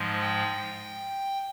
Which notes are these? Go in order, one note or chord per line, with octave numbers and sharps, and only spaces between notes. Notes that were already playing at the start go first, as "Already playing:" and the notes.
Already playing: G#2 F3 G#3
G5